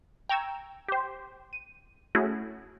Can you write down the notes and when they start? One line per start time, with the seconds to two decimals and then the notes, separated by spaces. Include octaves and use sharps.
0.29 G5 A#5 C#6 E6 G#6
0.89 G4 C5
1.53 D#7
2.15 A3 C#4 E4 F#4 G#4